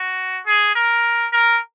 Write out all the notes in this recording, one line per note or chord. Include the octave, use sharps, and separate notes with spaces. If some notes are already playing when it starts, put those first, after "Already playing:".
Already playing: F#4
G#4
A#4
A#4